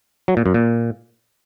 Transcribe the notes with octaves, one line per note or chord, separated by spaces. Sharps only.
F#3
A#2
F#2
A#2